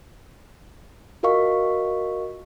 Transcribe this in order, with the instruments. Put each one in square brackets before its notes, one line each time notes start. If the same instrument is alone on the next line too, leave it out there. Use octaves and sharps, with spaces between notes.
[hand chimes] F4 F#4 A#4 D#5 F5 C#6